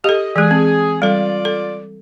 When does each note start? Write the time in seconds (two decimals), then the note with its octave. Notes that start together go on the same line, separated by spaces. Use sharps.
0.04 G4 A4 D#5
0.36 E3 G#3 G#4
0.51 C4
1.02 G3 F4 A4 D5
1.45 A4